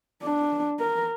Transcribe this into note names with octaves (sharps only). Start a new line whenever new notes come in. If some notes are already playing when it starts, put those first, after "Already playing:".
D4
A#4